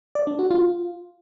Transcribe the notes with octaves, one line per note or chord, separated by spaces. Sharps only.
D5
D4
F#4
F4